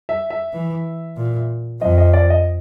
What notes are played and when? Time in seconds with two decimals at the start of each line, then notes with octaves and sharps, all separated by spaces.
0.09 E5
0.30 E5
0.53 E3
1.17 A#2
1.81 F2 D#5
1.98 D#5
2.13 D5
2.30 D#5